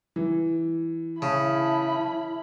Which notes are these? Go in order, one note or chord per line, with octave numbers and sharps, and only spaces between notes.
E3
C#3 E4 A5 B5